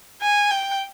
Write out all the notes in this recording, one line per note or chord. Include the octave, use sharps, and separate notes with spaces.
G#5
G5